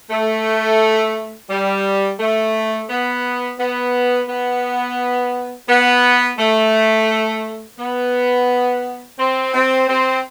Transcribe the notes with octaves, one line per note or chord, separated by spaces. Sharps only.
A3
G3
A3
B3
B3
B3
B3
A3
B3
C4
C4
C4